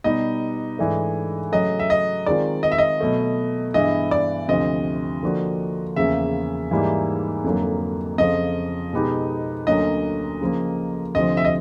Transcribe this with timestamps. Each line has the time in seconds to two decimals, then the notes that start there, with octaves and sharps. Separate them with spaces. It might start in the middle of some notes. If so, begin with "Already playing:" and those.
0.04 B2 G3 B3 D#4 G4 D#5
0.78 G#2 E3 A3 D4
1.52 C#3 F#3 A3 D#5
1.79 E5
1.90 D#5
2.26 D#3 G#3 C4 F4 D5
2.63 D#5
2.72 E5
2.78 D#5
3.00 B2 F#3 A3
3.74 G2 E3 G#3 B3 E4 D#5
4.11 D5
4.48 D2 C3 F3 D#5
5.23 D3 F3 A#3 D4 F#4
5.96 E2 C#3 F3 A#3 E5
6.71 G#2 E3 G3 A#3 D#4
7.44 F2 D3 F#3 A#3
8.18 F2 C#3 F3 D#5
8.93 B2 G#3 B3 D#4 G4
9.67 D2 D3 F#3 A#3 C#4 D#5
10.41 C#3 F3 A#3
11.15 D2 C3 F3 D#5
11.37 E5
11.45 D#5